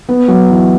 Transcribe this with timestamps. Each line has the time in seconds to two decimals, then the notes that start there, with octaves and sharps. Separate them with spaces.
0.09 B3
0.28 F#3
0.50 E3